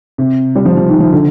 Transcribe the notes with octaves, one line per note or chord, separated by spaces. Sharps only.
C3
G3
F3
F3
D#3
F3
D3